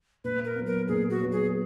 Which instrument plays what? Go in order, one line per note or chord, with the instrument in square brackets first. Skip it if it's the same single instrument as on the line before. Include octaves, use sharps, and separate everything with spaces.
[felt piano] A#2 [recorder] B4
[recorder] A#4
[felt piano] F#3 B3
[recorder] A#4
[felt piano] A#2 [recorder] G#4
[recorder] F#4
[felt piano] F#3 B3
[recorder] G#4